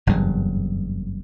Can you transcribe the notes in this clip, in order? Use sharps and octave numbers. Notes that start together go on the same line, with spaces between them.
F#1 E2 G2